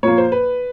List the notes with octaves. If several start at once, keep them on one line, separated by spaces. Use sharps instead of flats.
A#2 F3 A#3 C#5
C5
B4